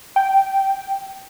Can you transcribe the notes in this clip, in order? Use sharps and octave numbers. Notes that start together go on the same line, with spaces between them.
G5